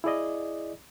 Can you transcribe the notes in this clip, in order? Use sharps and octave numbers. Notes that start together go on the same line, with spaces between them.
E4 G#4 D5 D#5